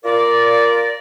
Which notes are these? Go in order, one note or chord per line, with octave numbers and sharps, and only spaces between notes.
F4 A#4 D5